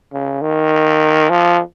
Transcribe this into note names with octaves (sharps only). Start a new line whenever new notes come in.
C#3
D#3
F3